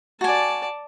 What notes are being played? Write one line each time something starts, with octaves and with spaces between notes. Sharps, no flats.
F#4 D5 G#5 A5